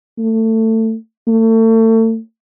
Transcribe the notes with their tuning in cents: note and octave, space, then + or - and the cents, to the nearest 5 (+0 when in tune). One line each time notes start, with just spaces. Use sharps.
A3 +25
A3 +35